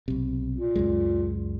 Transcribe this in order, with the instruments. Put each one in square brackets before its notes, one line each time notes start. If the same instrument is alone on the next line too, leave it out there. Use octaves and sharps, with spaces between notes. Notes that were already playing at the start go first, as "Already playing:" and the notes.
[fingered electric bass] B1 C3
[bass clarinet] A#2
[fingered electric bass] C#2 F#2 G#3